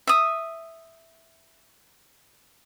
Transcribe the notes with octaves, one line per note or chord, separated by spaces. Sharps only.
E5 D#6